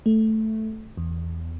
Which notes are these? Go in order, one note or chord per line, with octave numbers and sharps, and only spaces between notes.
A3
E2